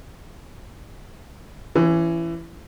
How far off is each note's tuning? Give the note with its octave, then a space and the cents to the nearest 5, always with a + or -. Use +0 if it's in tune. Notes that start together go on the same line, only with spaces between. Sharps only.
E3 +20 C#4 -5